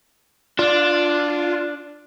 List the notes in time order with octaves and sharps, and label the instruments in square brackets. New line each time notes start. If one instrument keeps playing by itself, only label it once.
[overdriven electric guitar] D4 [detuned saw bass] F4